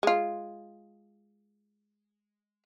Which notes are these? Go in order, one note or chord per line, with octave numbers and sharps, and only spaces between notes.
G#3 F4